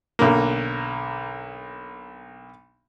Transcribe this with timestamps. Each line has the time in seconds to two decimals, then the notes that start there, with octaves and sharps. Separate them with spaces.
0.19 B1 D3 A#3